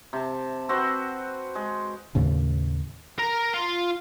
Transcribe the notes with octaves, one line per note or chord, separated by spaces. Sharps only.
C3 A5
C4 F#4 B4 C5
G#3
D#2 A2 C#3
A#4 A#5
F4